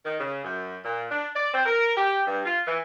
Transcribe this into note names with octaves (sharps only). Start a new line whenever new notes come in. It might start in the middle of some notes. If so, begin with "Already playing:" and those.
D#3
C#3
F#2
A#2
D4
D5
C4
A#4
G4
G2
F4
E3